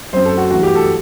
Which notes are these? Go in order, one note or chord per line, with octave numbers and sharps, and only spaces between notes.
F#2 F#3 C4 C5
A4
F#4
G2 E3 A3 F#4
G4
A4